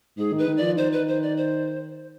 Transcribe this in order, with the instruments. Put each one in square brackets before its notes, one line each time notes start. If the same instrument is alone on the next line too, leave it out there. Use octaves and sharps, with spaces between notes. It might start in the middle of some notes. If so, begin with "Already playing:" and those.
[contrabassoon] G#2 [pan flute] G#4
[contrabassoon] D#3
[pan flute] B4
[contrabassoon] D#3
[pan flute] D5
[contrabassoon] F3
[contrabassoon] D#3 [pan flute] C5
[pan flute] B4
C5
D5
C5